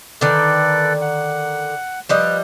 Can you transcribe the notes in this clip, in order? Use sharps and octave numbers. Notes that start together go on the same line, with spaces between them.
D3 D#3 A4 B4 D5
F#5
F3 G3 B4 D#5